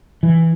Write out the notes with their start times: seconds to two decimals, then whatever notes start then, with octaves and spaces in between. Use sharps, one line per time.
0.23 E3